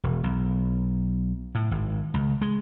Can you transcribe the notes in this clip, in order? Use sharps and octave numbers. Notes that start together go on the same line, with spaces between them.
E1
B1
A2
G#1
C#2
G#3